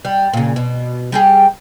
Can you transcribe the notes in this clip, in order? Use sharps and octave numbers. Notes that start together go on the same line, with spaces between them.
G3
A#2 C#3
B2
G3 G4 G#4